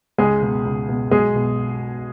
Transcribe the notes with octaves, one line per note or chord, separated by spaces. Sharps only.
C#2 G#3 G#4
B2 G#3
C#2
B2 G#3
B1 G#3 G#4
B2